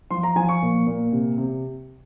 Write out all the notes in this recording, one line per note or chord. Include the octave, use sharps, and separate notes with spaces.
F3 C6
A#5
F3 G#5
C#6
A#2
A#2
C3
C3